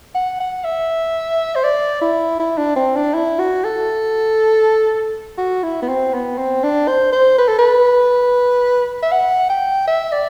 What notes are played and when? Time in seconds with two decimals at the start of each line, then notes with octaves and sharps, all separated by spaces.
0.15 F#5
0.40 F#5
0.64 E5
1.56 C5
1.64 D5
2.01 E4
2.40 E4
2.58 D4
2.76 C4
2.96 D4
3.14 E4
3.39 F#4
3.64 A4
5.38 F#4
5.63 E4
5.82 B3
5.89 C4
6.14 B3
6.38 C4
6.64 D4
6.88 C5
7.12 C5
7.38 B4
7.48 A4
7.59 B4
9.03 E5
9.12 F#5
9.50 G5
9.87 E5
10.12 D5